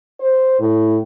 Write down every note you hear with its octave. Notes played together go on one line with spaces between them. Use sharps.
C5
A2